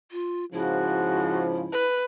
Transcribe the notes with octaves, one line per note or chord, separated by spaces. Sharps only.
F4
G#2 C#3 F3 E4 F#4
B4